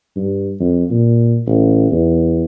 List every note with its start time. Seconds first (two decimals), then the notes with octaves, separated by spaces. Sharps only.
0.16 G2
0.60 F2
0.90 A#2
1.47 A1
1.91 E2